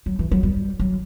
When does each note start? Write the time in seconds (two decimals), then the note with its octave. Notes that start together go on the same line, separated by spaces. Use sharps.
0.06 F#3
0.19 E3
0.31 F#3
0.43 G3
0.80 F#3